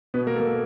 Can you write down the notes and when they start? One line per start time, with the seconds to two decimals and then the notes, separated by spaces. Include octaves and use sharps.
0.14 B2 B3 B4
0.27 A#3 A#4
0.36 A4
0.40 A#3 A#4